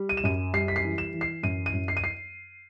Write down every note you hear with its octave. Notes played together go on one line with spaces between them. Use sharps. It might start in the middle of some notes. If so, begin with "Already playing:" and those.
Already playing: G3
D#7
E7
F#2 D#7
G3 C7
B6
C7
E3
E7
E3
C7
F#2 D#7
D#7
F#2
C7
D#7
C7